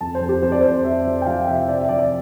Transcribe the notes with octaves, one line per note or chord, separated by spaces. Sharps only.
F2 A5
C5
F2
G4
F2 C5
D5
F2 C5
F2 E5
F3
G5
F3 F5
C3 E5
C3 D5
E5
F3 D5
D5